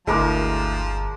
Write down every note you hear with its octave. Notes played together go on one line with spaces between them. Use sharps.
G1 D2 F3 G#3 E4 A#4 D6